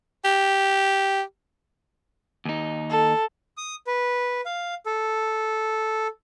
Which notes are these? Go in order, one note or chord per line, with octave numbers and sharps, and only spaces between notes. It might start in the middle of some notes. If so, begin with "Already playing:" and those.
G4
D#2 D#4
A4
D#6
B4
F5
A4